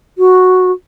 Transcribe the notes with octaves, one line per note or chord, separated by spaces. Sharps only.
F#4